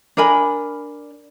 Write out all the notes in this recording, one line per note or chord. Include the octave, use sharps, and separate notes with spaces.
D4 A#4 G#5 B5